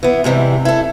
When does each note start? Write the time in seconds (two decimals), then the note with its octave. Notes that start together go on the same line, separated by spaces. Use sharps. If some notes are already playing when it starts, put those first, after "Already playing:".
0.03 E3 B3
0.24 G#2 C3 E3 G3
0.65 E4 A4